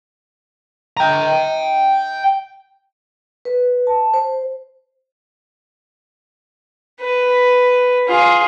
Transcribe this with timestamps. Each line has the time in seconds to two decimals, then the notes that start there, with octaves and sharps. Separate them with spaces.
0.97 G5 A#5
3.45 B4
3.87 A5
4.14 C5
7.01 B4
8.08 F4 G#4